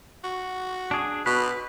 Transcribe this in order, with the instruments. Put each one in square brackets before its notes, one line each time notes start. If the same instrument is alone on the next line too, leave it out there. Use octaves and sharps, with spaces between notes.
[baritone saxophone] F#4
[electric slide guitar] D4 G#4
[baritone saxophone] B2 [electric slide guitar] B4